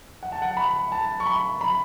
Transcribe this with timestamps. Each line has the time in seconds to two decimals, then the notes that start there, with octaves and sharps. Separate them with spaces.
0.23 F#5
0.32 A5
0.42 F#5
0.57 B5
0.92 A5
1.20 C#6
1.26 B5
1.61 B5